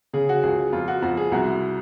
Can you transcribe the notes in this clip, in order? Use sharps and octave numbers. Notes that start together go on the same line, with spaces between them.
C#3 G#4
F#4
C#2 G#4
F2 F4
F#4
F2 F#4
G#4
C2 F#4